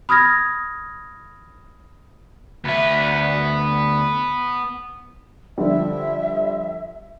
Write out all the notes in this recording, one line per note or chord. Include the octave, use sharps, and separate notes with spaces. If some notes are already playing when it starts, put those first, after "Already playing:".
B5 D#6 F6 G#6 A#6
D2 B3 E5
D3 F3 G3 E5